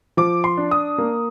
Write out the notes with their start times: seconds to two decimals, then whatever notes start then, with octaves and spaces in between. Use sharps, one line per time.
0.17 F3 D6
0.44 C6
0.57 D4
0.71 D#6
0.98 A#3